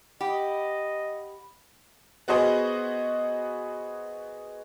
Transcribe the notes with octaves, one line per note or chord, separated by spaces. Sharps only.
G4 D#5 F#5 B5
B3 F#4 G#4 C5 D#5